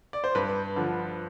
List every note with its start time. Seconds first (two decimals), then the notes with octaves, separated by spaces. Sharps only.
0.13 D5
0.24 C5
0.35 G2 B4
0.76 D3 F3